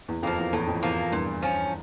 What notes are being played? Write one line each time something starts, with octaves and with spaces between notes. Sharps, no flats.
E2
F2 F3 A#3
E2
E2 A2
F2
E2 F3 A#3
E2 G2 A#2
F3 C#4